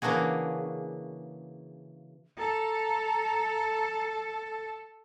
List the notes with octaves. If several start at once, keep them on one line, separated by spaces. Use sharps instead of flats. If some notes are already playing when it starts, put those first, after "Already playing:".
C#3 E3 A#3 D4 F#4 G#4
A4 A#5